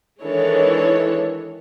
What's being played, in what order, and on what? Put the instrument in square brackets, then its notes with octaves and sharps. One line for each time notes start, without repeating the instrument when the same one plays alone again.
[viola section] D#3 E3 G#3 D4 A4 C#5